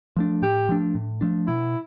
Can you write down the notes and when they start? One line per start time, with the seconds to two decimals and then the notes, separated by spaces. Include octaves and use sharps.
0.17 F3 A3 D4
0.42 A2 G4
0.69 F3 A3 D4
0.95 A2
1.21 F3 A3 D4
1.47 B2 E4